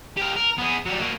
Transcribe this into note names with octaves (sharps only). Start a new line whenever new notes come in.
G4 A#4
A#4
B3 G#4
F#3 G3
A#3 F#4